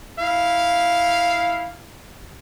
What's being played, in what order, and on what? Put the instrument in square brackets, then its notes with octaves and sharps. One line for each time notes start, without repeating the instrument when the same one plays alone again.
[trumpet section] E4 F5